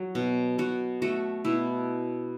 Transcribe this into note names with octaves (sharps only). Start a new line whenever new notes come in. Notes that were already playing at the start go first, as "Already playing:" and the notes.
Already playing: F#3
B2
B2 F#4
A3 F#4
B2 E4